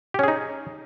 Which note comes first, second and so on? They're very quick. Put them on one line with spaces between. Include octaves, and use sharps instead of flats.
G4 C#4 G#4 D#4